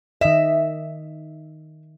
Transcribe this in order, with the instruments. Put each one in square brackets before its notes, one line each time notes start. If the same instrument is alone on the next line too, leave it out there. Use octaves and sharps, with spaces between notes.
[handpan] D#3 D#5 [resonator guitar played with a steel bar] E5